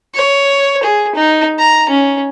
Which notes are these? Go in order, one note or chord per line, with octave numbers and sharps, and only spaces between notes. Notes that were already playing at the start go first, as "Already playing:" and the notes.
C#5
G#4
D#4
A#5
C#4